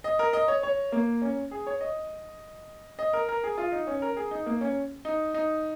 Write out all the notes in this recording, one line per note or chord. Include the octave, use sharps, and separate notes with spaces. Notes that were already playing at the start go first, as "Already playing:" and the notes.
D#5
A#4
D#5
C#5
C#5
A#3
C#4
G#4
C#5
D#5
D#5
A#4
A#4
G#4
F4
D#4
C#4
A#4
G#4
D#4
A#3
C#4
D#4
D#4